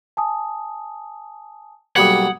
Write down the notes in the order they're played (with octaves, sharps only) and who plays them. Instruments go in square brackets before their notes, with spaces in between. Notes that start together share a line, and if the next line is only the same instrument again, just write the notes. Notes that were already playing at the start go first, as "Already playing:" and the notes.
[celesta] G#5 A5 D#6
[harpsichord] B1 G3 A#3 [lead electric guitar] F#5 [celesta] D#6 G#6